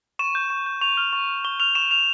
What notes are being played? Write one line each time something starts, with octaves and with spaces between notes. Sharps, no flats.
C#6 E7
G6
C#6
G6
C#6 F7
F6
C#6
F6
C#6 G7
F6 F7
C#6 E7
F6 F7